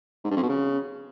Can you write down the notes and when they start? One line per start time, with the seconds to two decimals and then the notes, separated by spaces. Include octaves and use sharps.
0.24 G#2
0.31 G2
0.37 F2
0.43 B2
0.49 C#3